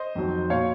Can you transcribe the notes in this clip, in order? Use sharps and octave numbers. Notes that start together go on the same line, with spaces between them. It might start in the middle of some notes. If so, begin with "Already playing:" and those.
Already playing: C5 D#5
F2 D#3 F#3
A#2 F#3 C#5 F5